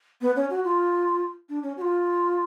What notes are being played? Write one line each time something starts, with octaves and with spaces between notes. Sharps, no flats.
B3
C#4
F#4
F4
D4
C#4
F#4
F4